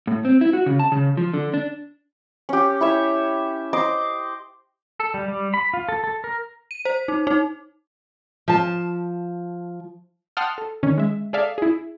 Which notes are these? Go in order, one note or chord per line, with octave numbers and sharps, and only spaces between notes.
A2
C4
E4
F#4
C#3
A5
C#3
F3
D3
D4
C#4 G4
E4 C#5 E5
C5 D#5 D6
A4
G3
G3
B5
F4
A4
A4
A#4
D#7
C5
D#4
D#4
F3 A5
F#5 G5 A5 C6 D#6 F6
A4
D3 D#3 C#4
G#3 E5
G#4 A4 D5 E5 F5
E4 G#4